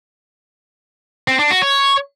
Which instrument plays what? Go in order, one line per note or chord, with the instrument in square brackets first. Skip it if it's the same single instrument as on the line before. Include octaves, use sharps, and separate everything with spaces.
[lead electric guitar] C4
D4
F#4
C#5